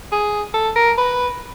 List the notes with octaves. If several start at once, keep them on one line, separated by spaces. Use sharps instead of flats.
G#4
A4
A#4
B4